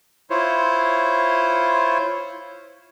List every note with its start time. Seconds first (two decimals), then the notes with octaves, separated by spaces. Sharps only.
0.30 E4 F4 C5 C#5